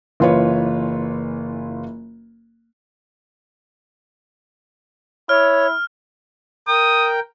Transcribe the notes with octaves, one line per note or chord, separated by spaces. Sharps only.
F#1 E3 F4 B4 C#5
E4 C#5 F6
A#4 G5 D#6